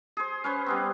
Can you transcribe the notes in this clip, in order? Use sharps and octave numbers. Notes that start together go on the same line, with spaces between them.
G#4 C5
C#4 B4 C5
G3 B3 C4